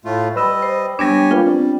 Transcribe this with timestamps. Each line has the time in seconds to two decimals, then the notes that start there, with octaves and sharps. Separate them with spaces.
0.05 A2 A3 F4
0.36 G3 B4 D#5 B5 E6
0.62 C5
0.99 G3 B3 D4 G4 C#5 G#5
1.31 A#3 F4 B4 F5
1.44 G3 C4 D4